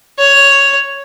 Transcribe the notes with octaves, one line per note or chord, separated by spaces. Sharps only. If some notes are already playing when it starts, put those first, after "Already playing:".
C#5